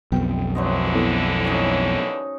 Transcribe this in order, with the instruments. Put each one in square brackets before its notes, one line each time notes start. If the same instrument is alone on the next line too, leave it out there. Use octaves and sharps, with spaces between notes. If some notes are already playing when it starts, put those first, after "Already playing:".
[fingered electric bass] B1 F2 [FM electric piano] F3 B3 G5
[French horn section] D#2 D3 E3 [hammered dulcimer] F#3 C5 D#5
[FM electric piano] B3 E4 A4
[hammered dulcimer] C#4 D#4